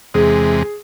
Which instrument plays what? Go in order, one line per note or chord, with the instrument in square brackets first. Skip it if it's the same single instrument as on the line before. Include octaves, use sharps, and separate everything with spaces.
[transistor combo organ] E2 C3 G#3 [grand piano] G#4